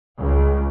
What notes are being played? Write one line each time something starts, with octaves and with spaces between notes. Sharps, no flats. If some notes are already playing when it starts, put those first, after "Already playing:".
C#2